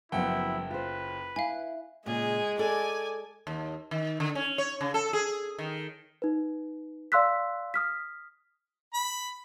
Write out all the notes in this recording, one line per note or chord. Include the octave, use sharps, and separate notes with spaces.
F#1 F3 F#3 B3 E4 F#5 G5
F4 B4 C5
E4 F5 G#5
A#2 C#3 G#3 G#4
G#4 A4 D5 G#5
D#2
D#3
D3
C#4
C#5
C#3
A4
G#4
D#3
D#4 B4
D5 F5 C6 E6 F#6 B6
D#6 F6 B6
B5